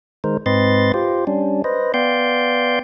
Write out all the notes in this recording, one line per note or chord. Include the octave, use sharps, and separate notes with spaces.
D#3 G#3 A#4 C5
G#2 C4 B4 D#5 C6 A6
F4 G4 C5
G3 C#4 D4
B4 C5 D#5
B3 D5 F5 G5 C6 G6